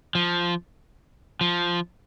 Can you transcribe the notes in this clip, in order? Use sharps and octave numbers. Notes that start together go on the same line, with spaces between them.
F3
F3